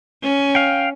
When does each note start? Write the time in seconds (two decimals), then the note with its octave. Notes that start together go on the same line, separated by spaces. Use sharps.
0.22 C#4
0.55 F5 G5